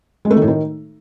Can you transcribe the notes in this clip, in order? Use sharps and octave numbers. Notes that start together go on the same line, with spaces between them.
G#3
A3
D#3
A2
D#3